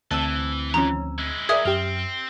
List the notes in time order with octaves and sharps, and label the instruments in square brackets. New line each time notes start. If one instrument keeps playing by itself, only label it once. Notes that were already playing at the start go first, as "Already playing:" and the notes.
[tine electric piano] D2 C4 E6 [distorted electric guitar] E3 [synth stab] A5
[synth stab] D#3 F3 C#4 [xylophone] A#5
[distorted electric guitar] G#3 E4
[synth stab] G#4 A#4 D5 [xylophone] E5 D#6 G#6
[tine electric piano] F#2 [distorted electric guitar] C4 [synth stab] G4 F6